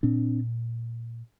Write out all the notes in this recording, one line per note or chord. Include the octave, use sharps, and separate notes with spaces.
A#2 C4 D4